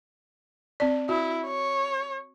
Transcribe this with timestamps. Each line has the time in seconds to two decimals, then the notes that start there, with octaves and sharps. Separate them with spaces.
0.80 C4 D5
1.09 E4 F#4
1.46 C#5